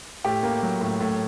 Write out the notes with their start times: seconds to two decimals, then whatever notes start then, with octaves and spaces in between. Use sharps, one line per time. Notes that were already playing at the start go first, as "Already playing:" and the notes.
0.24 A2 G4
0.43 A#3
0.63 F#3
0.81 A2
1.00 A2